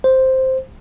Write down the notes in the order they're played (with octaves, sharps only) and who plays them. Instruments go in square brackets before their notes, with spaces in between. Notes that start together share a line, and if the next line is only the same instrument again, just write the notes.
[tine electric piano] C5